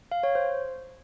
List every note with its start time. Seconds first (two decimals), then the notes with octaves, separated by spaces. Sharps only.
0.12 F5
0.23 C#5
0.35 C5